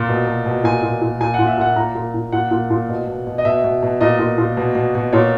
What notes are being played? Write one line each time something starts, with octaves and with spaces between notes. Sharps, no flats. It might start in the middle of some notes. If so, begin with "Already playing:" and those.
Already playing: A#2
B2
B2
B2
A#2 G#5
A#2
A#2
A#2 G#5
F#5
A#2
E5
A#2 F#5
A#2 A#5
A#2
A#2
A#2 F#5
A#2
A#2
B2
B2
B2
D#5
B2 E5
B2
B2
A#2 D#5
A#2
A#2
B2
B2
B2
A#2 C#5